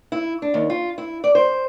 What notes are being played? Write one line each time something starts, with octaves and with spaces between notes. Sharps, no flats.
E4
D4
D#2
F4
E4
D5
C5